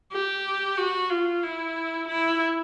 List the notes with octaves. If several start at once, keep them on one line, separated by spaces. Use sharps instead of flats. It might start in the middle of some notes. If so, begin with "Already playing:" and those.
G4
F#4
F4
E4
E4